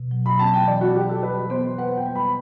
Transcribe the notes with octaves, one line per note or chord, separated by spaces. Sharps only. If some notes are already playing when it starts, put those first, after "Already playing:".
Already playing: B2
F#3
B5
C4 A5
G5
E3 D5
F#4
E3 G4
A4
G3 B4
B3 C5
B4 F#5
G5
G3
B5